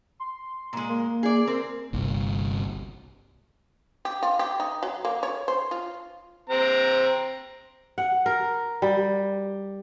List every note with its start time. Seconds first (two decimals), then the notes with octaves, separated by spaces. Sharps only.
0.20 C6
0.73 A#2 G#3
0.89 A#3
1.23 G#4 D5
1.47 C4 A#4
1.93 G1 C2
4.05 G4
4.23 F4
4.39 G4
4.60 D#4
4.83 F#3
5.05 A#3
5.23 C#5
5.48 C5
5.71 F4
6.50 C4 A#5
7.98 F#5
8.26 A#4
8.82 G3